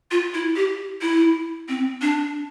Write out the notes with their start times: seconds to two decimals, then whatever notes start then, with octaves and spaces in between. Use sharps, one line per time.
0.11 F4
0.34 E4
0.56 G4
1.02 E4
1.69 C4
2.02 D4